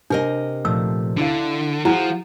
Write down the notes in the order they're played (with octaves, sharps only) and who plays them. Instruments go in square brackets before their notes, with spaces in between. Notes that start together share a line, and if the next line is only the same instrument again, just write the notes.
[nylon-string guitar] C3 A#4 D#5 [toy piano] D4
[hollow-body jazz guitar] A#2 F3 A3 [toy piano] E6
[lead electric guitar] D3 [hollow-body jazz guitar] D4 E4 F5
[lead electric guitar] F3 [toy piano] E4 [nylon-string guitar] F#4 [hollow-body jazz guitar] G#4